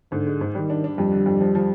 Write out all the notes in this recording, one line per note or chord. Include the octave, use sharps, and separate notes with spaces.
G#2 D3
G#3
G#2
D#3 G3
D4
D4
F2 G3
D3
F2
F3
F3